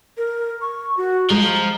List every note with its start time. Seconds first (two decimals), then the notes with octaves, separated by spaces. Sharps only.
0.17 A#4
0.61 C#6
0.97 F#4
1.30 F3 G#3 A#5